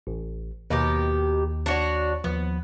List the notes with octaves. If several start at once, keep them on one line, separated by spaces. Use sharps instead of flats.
A1
D#2 B2 D#3 G4
D4 F#4 C#5
D#2 F3 B3